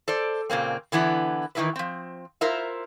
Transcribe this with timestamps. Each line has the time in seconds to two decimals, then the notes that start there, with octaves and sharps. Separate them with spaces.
0.08 A4 C5 D5
0.50 A#2 C#3 A#3 C4
0.92 D3 E3 B3 E4
1.55 D#3 E3 F#3 E4 A#4 B4
1.76 F3 C4
2.41 E4 F4 A#4 C5 E5